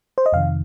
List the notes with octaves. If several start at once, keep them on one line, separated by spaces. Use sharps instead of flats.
C5
D#5
F2 C3 D#3 F5